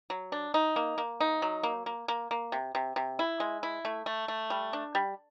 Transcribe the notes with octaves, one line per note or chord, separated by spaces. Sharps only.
F#3
D4
D#4
A#3
A#3
D#4
F#3
A#3
A#3
A#3
A#3
C3
C3
C3
E4
G#3
E4
A3
A3
A3
G3
D4
G3